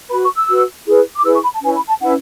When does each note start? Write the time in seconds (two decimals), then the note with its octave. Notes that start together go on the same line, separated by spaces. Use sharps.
0.10 F#4 B4 B5
0.24 C#6
0.36 E6
0.49 F#4 B4
0.87 E4 G#4 B4
1.15 D6
1.24 E4 G#4 B4 E6
1.34 C#6
1.43 B5
1.53 A5
1.62 C#4 E4 B4 G#5
1.76 B5
1.88 A5
2.01 C#4 E4 B4 F#5